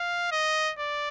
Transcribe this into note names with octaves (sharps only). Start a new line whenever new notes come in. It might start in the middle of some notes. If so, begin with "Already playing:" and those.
Already playing: F5
D#5
D5